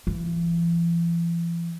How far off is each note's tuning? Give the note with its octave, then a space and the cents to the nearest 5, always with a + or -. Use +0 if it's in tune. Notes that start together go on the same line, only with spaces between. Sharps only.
E3 +45